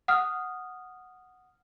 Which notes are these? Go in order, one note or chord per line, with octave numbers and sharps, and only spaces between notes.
F#5 D#6 F6